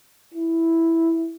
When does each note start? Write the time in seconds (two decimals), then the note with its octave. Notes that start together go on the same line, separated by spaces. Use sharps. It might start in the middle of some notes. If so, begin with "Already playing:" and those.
0.34 E4